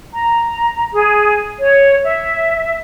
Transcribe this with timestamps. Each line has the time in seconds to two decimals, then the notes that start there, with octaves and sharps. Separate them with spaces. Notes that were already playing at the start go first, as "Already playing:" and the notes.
0.13 A#5
0.93 G#4
1.61 C#5
2.04 E5